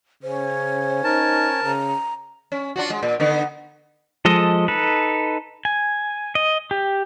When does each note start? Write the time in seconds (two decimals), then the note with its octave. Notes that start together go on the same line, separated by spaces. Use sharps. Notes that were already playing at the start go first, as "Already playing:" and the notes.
0.23 C#3 C#4 C5
1.04 D#4 A#4 A5
1.64 C#3 A#5
2.52 C#4
2.76 D4 F4 F#4
2.90 G#3
3.03 A#2
3.20 D3 B3 D#4
4.25 F3 G#3 A4 D#5
4.68 D#4 A4 B4
5.65 G#5
6.35 D#5
6.71 G4